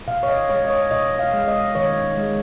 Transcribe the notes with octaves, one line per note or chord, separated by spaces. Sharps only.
B2 F5
C#5
D#5
G#3 C#5
D#5
C#5
B2 D#5
F5
G#3
D#5
D#3 C#5
G#3